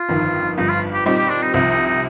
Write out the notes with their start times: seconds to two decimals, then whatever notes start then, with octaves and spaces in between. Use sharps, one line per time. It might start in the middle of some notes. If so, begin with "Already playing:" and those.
Already playing: F4
0.09 G1 F2 D#3
0.57 G1 G2 F3 D#4
0.69 F4
0.93 G4
1.06 A#2 G3 C4 D#4 G4
1.18 G4
1.30 D4
1.42 D#4
1.54 C2 C3 F3 D#4
1.70 D#4
1.87 D#4